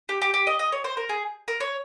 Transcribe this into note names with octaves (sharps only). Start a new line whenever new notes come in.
G4
G4
G4
D#5
D#5
C#5
C5
A#4
G#4
A#4
C#5